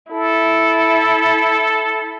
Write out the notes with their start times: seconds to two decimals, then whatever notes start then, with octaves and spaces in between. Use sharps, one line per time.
0.12 E4 A4